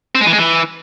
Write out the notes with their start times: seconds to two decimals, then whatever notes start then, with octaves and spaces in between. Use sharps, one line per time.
0.15 C4
0.21 G#3
0.27 E3
0.33 G#3
0.38 E3